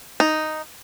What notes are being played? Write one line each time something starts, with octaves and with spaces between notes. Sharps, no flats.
D#4